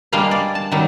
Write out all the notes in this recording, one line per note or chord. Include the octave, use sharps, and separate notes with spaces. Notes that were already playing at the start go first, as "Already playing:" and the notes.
G3 G#3 A#3 D4 F5
D5
A5
D#3 F#3 G3